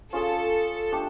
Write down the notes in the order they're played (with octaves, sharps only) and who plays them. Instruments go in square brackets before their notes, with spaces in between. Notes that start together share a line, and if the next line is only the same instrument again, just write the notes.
[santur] C#4 F4 G#4 C#5 [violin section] A4
[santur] A3 D4 G4